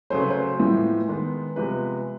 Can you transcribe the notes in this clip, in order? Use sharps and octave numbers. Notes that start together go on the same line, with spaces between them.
C#3 F#3 A3 C5
B4
C5
A2 F3 G#3 B3
D#3 G#3 B3
C3 F3 G#3 B3 B4